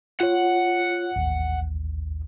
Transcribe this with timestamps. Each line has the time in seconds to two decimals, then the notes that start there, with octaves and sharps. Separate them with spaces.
0.21 F4 C#5 F#5
1.16 A1 D#2